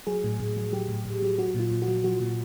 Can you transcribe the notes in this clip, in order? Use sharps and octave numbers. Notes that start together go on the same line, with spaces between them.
F#3 G#4
A2
A2
F#3
F#3 G4
A2
A2
F#3
F#3 F#4
A#2
F4
A#2
F#4
F#3
F#3 F#4
A#2